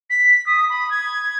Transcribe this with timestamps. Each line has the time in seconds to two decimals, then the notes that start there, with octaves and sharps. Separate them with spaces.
0.09 B6
0.46 D#6
0.69 B5
0.90 G#6